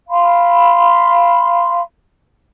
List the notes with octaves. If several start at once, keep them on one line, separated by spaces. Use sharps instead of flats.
F5 B5 C6